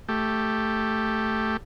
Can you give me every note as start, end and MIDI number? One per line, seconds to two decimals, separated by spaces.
0.08 1.57 57
0.08 1.57 67